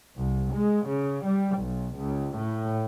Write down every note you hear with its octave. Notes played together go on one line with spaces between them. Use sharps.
C2
G#3
C#3
G3
B1
C#2
A2